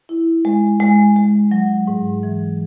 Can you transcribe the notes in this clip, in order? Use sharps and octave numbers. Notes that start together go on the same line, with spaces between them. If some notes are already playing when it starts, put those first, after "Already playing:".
E4
G#3
G#3
G#3
F#3
G#2
E3